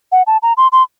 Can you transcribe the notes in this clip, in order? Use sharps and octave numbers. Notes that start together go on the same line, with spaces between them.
F#5
A5
A#5
C6
C6